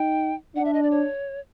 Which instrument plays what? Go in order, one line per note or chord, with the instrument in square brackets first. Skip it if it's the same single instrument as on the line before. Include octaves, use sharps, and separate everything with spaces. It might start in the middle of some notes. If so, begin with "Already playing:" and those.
Already playing: [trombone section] D#4 [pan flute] G5
[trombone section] D4 [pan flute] F#5
[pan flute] E5
D#5
D5
C#5